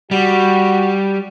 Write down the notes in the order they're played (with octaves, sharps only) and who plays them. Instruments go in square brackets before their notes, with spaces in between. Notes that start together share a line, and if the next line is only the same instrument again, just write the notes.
[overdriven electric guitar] G3 [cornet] F#4